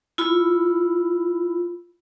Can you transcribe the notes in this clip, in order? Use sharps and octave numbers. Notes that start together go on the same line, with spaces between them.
E4 F4 B5